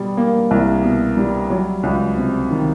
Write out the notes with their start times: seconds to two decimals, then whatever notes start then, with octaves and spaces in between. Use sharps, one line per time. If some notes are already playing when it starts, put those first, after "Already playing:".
Already playing: B2 G3
0.17 A#3
0.51 C2
0.84 B2
1.17 G3
1.50 F#3
1.83 C#2
2.17 C3
2.51 D#3